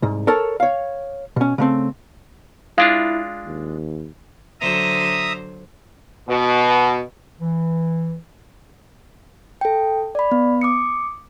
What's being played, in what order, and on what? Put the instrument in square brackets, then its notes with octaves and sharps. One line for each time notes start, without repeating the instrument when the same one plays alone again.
[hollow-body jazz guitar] C2 G#2
A4 A#4 C#5 A5
C#5 F5
B2 C#4
C#3 A3 C4
[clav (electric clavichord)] G#3 D4 F4 [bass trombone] E4 [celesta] F5
[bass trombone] D#2
[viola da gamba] D3 F#3 C5 [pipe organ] E5 A#5 D#6
[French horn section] B2
[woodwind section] E3
[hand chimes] A4 G5
D5 B5
B3
D6 D#6 C#7